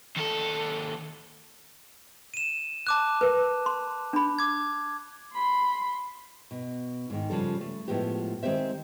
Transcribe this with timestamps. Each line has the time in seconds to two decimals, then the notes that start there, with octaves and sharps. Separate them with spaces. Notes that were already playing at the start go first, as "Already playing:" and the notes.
0.16 D#2 A4
2.34 D#7 E7
2.87 A5 D6 F#6
3.21 A#4 B4
3.66 C6
4.13 D4 B5
4.39 D6 G#6
5.34 B5 C6
6.51 B2
7.10 G#2 D#3
7.30 C#3 F3 G3 A4
7.61 A3
7.88 A2 F3 G#3 B3 G4
8.43 D#3 G#3 C4 G4 C5 E5